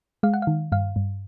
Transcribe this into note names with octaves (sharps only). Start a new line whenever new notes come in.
G#3 F5
F#5
D#3 F5
G2 F5
G2